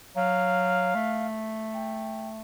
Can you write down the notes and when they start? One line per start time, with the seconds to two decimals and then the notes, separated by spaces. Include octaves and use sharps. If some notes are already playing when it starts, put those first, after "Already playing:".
0.16 F#3 F5
0.95 A3
1.74 G5